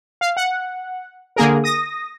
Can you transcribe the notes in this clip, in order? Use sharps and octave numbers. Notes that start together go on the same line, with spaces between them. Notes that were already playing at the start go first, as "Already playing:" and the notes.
F5
F#5
D3 A#3 G#4 A#4
D#6 A#6